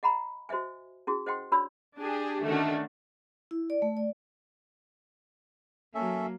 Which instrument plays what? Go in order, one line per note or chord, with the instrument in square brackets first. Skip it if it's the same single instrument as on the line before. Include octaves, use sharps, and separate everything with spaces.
[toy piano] D#5 F#5 A#5 B5
F#4 C5 D#5 E5 G#5
C#4 E4 F#4 G#4
C5 D#5 F#5 G5 C6
D4 F#4 C#5 D5 B5 E6
[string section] D4 G4 G#4
D3 D#3 A3 C#4 D4 F#4
[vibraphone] E4
D5
A3
D5
[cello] F#3 A#3 [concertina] C#4 A4 E5